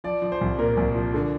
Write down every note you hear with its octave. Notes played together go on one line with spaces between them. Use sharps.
F3 D5
F3
C5
C2
A#2 A#4
C2
F3
D3